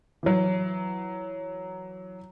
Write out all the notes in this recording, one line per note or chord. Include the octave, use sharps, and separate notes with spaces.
E3 F#3